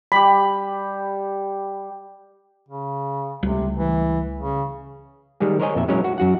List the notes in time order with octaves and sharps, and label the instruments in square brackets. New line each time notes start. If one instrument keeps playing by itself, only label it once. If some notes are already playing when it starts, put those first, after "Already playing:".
[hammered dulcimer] G3 G4 [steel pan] B5
[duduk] C#3
[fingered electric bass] C#2 G3 A3 [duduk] C3
[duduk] E3
C#3
[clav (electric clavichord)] D#3 G3 G#3 G4
A#4 C5 C#5 D#5 G#5
F2 A#2 E5
F#3 G#3 C#4 E4 A#4 C#5
F#4
F#2 F#4 F#5